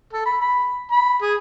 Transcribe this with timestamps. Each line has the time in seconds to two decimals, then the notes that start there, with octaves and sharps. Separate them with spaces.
0.13 A4
0.26 B5
0.41 B5
0.91 B5
1.22 G#4